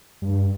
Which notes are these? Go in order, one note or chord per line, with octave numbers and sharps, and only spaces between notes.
G2